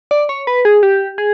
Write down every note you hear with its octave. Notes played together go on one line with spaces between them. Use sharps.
D5
C#5
B4
G#4
G4
G#4